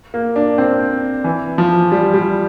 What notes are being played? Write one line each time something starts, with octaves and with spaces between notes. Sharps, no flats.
A#3
D4
C4
E3
F3
G3
G3